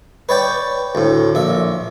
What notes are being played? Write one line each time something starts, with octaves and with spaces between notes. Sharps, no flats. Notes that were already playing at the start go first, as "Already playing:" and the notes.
B4 C#5 D5 G5
D2 A2
A#1 E5